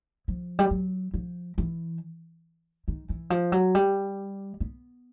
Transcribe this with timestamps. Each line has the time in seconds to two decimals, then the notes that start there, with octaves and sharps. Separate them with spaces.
0.28 F3
0.59 G3
0.71 F#3
1.14 F3
1.58 E3
2.88 D#3
3.09 E3
3.30 F3
3.52 F#3
3.75 G3
4.60 B3